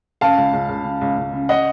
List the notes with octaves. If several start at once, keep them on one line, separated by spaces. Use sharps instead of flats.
C#3 F5 A5
C#2
C#2
C#2
C#3
C#2
C#2
C#3
D#5 F#5